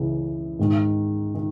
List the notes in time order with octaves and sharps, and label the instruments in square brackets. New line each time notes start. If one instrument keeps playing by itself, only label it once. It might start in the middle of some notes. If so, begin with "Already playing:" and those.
Already playing: [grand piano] C#2 C#3 E3
G#2 D#3
D#3